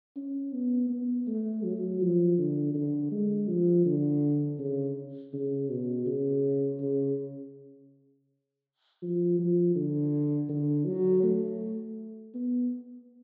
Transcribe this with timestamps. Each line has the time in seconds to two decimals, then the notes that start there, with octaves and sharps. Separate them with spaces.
0.16 C#4
0.52 B3
0.89 B3
1.27 A3
1.64 F#3
2.01 F3
2.38 D3
2.74 D3
3.11 G#3
3.48 F3
3.85 D3
4.59 C#3
5.33 C#3
5.70 B2
6.06 C#3
6.80 C#3
9.02 F3
9.39 F3
9.75 D3
10.49 D3
10.85 F#3
11.23 A3
12.34 B3